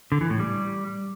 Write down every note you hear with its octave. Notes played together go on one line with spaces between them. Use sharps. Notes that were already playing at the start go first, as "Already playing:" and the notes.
D3
E3
A2
G3